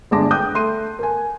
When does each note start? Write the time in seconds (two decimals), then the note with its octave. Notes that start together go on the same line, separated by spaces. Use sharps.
0.11 G1 G#3 D4 A5 D6 A#6
0.31 G5 D6 D#6 F#6 G6
0.54 A3 C6 D#7
0.99 A#4 G#5